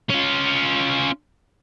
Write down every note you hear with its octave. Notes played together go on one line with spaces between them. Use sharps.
C#4 F4